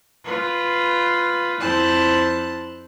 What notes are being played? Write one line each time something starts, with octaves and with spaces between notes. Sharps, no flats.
F4 B4
F2 E4 C5 A5 F#6